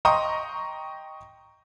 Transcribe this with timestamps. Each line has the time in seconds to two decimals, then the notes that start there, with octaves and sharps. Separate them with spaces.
0.05 D#5 G5 A#5 C6 C#6 D#6